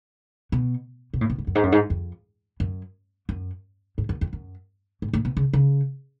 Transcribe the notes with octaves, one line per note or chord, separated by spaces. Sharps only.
B2
B2
A2
B2
G#2
F#2
G#2
F#2
G#2
F2
F#2
F#2
G#2
F#2
F2
F#2
G#2
A2
B2
C#3
C#3